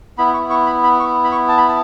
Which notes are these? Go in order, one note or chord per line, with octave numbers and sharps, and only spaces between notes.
B3 E4 B5
C#6
C#6
B5
B5
C#6
B5
C#6
A5
B5
A5